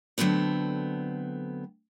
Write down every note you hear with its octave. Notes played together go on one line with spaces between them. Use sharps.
D3 F#3 A3 B3 C4